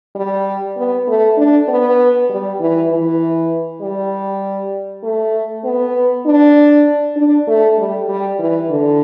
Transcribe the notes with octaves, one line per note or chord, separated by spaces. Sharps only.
G3
B3
A3
D4
B3
G3
E3
E3
G3
A3
B3
D4
D4
A3
G3
G3
E3
D3